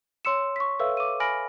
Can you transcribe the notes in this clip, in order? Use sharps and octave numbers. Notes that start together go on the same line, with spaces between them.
C#5 C6 E6 C#7 E7
C#6 B6
A4 B4 C#5 E5 F5 E6
D6 D#7
G#5 B5 F6 A#6 D7 F#7